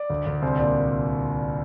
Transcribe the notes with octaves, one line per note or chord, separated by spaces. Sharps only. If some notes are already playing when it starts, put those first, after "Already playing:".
Already playing: D5
D2
D2
C2 C5
A#2 D5